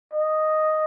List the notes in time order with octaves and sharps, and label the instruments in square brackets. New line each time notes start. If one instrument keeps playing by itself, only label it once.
[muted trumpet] D#5